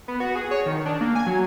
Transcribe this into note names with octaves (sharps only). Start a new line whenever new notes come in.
B3
F#4
G#4
C#5
D#3
D4
A#3
G#5
F#3